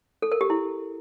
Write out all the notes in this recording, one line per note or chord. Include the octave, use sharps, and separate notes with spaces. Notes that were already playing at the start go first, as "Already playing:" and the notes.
A4
A#4
G4
E4